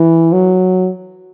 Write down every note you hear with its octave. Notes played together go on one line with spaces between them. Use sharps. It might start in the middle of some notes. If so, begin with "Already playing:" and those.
Already playing: E3
F#3